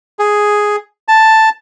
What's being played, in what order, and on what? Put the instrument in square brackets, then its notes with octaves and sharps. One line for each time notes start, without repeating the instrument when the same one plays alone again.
[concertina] G#4
A5